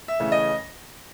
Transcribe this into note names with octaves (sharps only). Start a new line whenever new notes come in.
E5
C#3 E3 A3 C#4
D#5